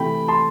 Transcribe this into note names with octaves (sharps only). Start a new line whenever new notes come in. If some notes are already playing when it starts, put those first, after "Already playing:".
Already playing: C3 E3 A3 G5 B5
A5 C6